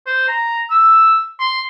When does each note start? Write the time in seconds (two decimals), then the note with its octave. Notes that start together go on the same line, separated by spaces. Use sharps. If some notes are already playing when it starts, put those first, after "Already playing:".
0.07 C5
0.28 A#5
0.70 E6
1.40 C6